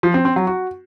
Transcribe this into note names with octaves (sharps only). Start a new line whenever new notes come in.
F3
C4
C4
F#3
F#4